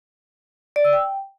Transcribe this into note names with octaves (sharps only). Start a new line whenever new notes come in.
D5
E6
G5